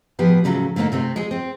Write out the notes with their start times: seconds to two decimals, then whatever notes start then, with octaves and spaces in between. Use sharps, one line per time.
0.19 A2 F3 B3 G4 G#4
0.44 A2 C#3 F#3 A3
0.76 D3 A3 A#3 C4 D#4
0.92 C3 A3 C4
1.16 G#3 G#4
1.31 C4